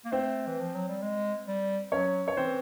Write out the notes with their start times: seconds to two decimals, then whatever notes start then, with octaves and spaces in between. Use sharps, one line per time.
0.05 A#3
0.12 A3 C4 C5
0.47 E3
0.61 F3
0.75 F#3
0.89 G3
1.02 G#3
1.48 G3
1.92 F#3 C#4 C#5
2.28 C#5
2.37 E3 C4 C5